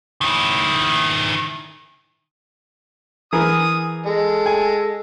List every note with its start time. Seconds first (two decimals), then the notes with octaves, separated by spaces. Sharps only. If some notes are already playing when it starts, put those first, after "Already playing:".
0.21 D#3 E4
3.33 E3 G#4 A#4 D#6
4.06 G#3 A4
4.46 G#5